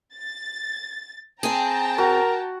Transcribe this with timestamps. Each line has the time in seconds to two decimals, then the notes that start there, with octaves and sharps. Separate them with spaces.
0.16 A6
1.43 C4 G#4 G5 A5 A#5
1.98 F#4 A#4